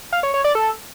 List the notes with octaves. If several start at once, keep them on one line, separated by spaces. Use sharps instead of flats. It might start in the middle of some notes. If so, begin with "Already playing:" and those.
F5
C#5
C#5
D5
A4